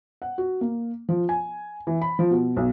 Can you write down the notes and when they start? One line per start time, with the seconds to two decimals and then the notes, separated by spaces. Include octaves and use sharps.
0.22 F#5
0.38 F#4
0.61 A#3
1.09 F3
1.29 G#5
1.87 E3
2.02 B5
2.19 F3
2.31 B2
2.57 B1